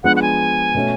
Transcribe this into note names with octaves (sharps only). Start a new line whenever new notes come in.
F3 G#3 B3 D4 F#5
F#5
G#5
B2 A3 C#4